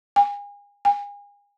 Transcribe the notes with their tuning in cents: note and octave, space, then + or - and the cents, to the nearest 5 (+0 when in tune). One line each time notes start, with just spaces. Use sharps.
G#5 -35
G#5 -35